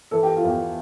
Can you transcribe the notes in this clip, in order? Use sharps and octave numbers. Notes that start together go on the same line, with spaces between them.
E3 A4
G4
F4
E2 G4